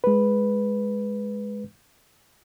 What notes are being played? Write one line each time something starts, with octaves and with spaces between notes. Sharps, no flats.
G#3 B4